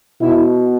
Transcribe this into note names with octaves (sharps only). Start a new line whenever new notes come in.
B2 E4